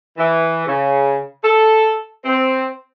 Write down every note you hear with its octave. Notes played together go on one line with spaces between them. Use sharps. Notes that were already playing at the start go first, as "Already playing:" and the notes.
E3
C#3
A4
C4